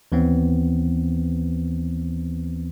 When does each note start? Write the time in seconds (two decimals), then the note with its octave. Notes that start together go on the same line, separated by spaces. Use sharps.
0.12 D#2 E3 B3 C4